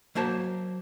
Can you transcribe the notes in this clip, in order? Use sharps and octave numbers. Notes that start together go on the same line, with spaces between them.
F#3 A#3 C5 A5